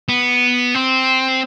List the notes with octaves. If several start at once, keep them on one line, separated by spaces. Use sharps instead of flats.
B3
C4